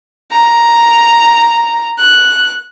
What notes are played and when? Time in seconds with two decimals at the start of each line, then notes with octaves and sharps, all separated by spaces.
0.32 A#5
1.99 F#6